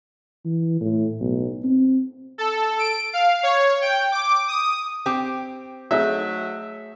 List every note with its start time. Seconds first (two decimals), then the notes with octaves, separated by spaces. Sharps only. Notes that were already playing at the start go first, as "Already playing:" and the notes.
0.45 E3
0.81 A2
1.20 B1
1.64 C4
2.38 A4
2.79 D7
3.13 F5
3.43 C#5
3.81 G5
4.12 D6
4.48 D#6
5.06 C4 G4 G5 D6
5.91 F#3 A3 D#4 G#4 E5